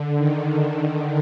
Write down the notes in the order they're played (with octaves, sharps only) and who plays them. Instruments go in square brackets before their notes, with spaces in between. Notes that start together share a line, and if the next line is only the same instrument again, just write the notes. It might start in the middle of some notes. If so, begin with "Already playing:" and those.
Already playing: [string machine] D3
D#3